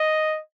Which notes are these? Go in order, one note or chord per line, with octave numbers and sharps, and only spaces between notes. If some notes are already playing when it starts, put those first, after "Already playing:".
Already playing: D#5